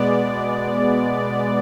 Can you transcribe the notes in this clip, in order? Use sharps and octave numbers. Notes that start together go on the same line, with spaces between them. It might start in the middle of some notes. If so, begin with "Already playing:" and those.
Already playing: B2 G#3 B3 D5